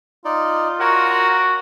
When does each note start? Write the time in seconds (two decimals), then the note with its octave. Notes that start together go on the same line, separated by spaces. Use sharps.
0.25 D#4 F4 D5
0.81 F#4 A#4 C#5 F#5